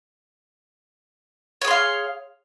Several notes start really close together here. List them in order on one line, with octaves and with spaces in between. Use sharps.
C#5 G#4 C6 F5